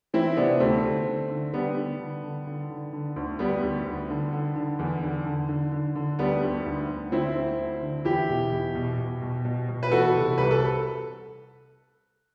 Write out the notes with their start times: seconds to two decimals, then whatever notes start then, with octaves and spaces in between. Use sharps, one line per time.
0.14 E3 C4 E4
0.37 C3 B3 D4
0.60 D2 A3 C4
0.83 D3
1.07 D3
1.30 D3
1.53 D3 G3 B3
1.77 D3
2.00 D3
2.23 D3
2.47 D3
2.70 D3
2.93 D3
3.16 D2
3.39 D2 G3 B3
3.63 D2
3.86 D2
4.10 D3
4.33 D3
4.55 D3
4.79 E2
5.03 D3
5.25 D3
5.49 D3
5.72 D3
5.95 D3
6.19 D2 G3 B3
6.43 D2
6.66 D2
6.89 D2
7.12 D3 C4 E4
7.35 D2
7.59 D2
7.82 D3
8.05 E2 E4 G4
8.29 B2
8.52 E2
8.75 B2
8.98 B2
9.22 B2
9.45 B2
9.69 B2
9.83 B4
9.91 E3 F#4 A4
10.15 C3
10.38 C2 B4
10.51 A4